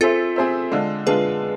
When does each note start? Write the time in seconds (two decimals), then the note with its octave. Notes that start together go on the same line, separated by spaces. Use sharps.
0.01 C4 F4 G#4 A4 C5 E5
0.36 C4 G#4 C5 E5
0.72 D3 G#3 D4 F4
1.07 D3 G#3 D4 F4 G#4 B4